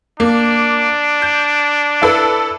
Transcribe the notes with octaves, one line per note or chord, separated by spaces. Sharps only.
A#3 D4
G6
E4 A4 B4